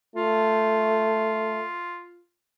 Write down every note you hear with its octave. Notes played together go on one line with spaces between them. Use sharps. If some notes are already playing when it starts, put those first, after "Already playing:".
A3 F4